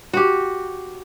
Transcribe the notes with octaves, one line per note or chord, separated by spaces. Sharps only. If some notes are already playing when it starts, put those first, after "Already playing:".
F#4 G4